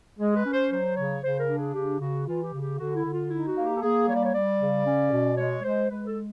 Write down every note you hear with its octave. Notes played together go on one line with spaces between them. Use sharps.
G#3 G#4
B4
C#4
C5
F#3 C5
C#3 C#5
C#3 C5
A#4
D4
G#4
C#3 G4
C#3 F#4
E3 F4
G4
C#3
G4
D3 F#4
E4
D3
F4
D#4 E4
F#4
A#3
G4
A4
A#3 G#4
G3 C#5
D5
C#5
G3 D5
C#3
C#4
B2
G#3 C#5
G#3 C5
G#3 B4
A4